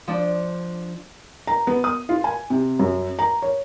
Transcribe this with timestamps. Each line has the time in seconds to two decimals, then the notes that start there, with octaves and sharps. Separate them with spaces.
0.07 F3 D4
1.47 A#5
1.67 B3
1.84 D#6
2.09 F4
2.24 G#5
2.50 C3
2.79 F#2
3.19 A#5
3.42 C#5